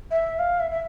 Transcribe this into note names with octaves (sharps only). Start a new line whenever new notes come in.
E5
F5
E5
E5